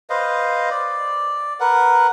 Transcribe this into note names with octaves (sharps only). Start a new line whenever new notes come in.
B4 C5 D#5 F5
D5
A#4 B4 F#5